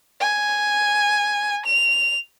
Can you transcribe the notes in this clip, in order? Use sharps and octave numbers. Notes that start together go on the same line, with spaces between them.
G#5
F7